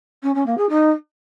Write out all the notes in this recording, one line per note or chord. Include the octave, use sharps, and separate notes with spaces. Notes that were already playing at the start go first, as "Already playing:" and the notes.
C#4
C#4
A#3
G#4
D#4